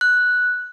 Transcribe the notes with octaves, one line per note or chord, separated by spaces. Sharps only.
F#6